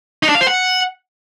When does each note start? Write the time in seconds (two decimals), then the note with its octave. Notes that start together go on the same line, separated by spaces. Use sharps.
0.23 D#4
0.29 D4
0.35 F5
0.41 C5
0.47 F#5